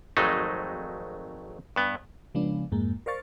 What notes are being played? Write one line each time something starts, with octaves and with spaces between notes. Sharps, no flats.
G#1 F2 F#3 G#3 A3 D#4
G2 B3
C#3 F3 G#3 B3 D4
F2 G#2 G#3 A#3
A#4 C5 D5 F5 C#6 A6